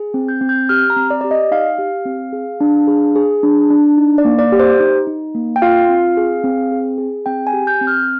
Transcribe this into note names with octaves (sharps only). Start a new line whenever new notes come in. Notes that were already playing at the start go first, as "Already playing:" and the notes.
Already playing: G#4
C4
G6
C4
G6
G4 F6
A#5
C4
D5
G4 D5
D#5
D#4 F5
G4
C4
G#4
D4
G#4
G#4
D4
D4
D#4
D5
A#3
D5
G4
C5
D#4
D#4
A#3
G5
F4 F5
C4
G#4
C4
G#4
G#4
C4 G5
G#5
G4
G6
C4
F6